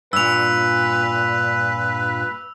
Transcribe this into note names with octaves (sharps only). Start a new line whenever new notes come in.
G2 A#2 B4 E6 F7